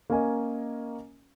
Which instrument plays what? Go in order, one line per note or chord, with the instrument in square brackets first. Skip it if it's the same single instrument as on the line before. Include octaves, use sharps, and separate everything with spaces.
[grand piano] A#3 C#4 A#4 D#5 G#5